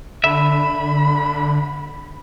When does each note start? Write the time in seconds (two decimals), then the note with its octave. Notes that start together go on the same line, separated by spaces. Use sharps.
0.24 D3 E5 B5